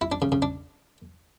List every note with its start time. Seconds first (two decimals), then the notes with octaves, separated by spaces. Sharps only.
0.01 E4
0.12 D4
0.22 C#3
0.32 C#3
0.42 D4